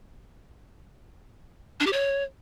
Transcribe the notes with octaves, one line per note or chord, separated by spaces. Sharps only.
D4
G4
C#5